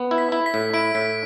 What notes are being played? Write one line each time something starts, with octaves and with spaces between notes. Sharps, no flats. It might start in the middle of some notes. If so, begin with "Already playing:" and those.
Already playing: B3
E4
B6
E4
B6
A2
E4 D7
A2 B6